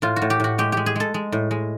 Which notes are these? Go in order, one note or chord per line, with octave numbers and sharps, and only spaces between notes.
A2 F4
F#4
A2
G4
A2 F#4
G#3 G4
G#3 G4
G#4
G#3 A4
G#3
A2
G#3